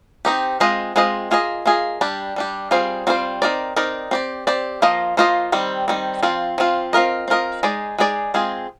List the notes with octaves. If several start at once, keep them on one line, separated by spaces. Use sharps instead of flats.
C4 D#4 G4
G#3 C4 F4 C5 D#5
G#3 C4 F4 C5 D#5
A#3 F4 G#4 D#5
A#3 F4 G#4 D#5
G3 D4 G4
G3 D4 G4
G3 C4 F4 G#4 C5
G3 C4 F4 G#4 C5
C4 D#4 A#4 D5
C4 D#4 A#4 D5
C4 G4 D5
C4 G4 D5
F3 A#3 F4 C5 D#5
F3 A#3 F4 C5 D#5
D#3 G3 C4
D#3 G3 C4
F3 C4 F4
F3 C4 F4
C4 F4 A#4 D#5
C4 F4 A#4 D#5
G#3 D#4 G#4 D5
G#3 D#4 G#4 D5
G#3 C4 F4 G#4